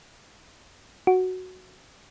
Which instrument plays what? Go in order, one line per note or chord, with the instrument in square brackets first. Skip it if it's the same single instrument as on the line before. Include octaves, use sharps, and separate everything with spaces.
[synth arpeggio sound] F#4